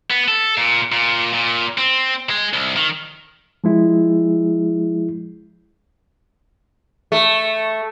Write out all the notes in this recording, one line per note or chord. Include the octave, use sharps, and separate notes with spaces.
B3
A4
A#2
A#2
A#2
C4
G#3
C2
D#3
F3 G#3 E4 G#4
A3